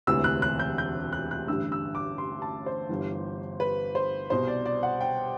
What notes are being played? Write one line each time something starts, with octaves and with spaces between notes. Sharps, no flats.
E1 D2 C3 E3 E6
F#6
F#6
G6
G6
F#6
F#6
A1 G2 D3 E6
E6
D6
C6
A5
C5
G1 G2 E3
B4
C5
C2 B2 C5
D5
D5
F#5
G5